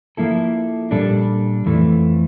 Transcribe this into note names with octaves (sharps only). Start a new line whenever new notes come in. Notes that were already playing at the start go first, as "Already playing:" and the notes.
F3 A#3 E4 A4
A#2 G3 D4 A4
F2 E3 A3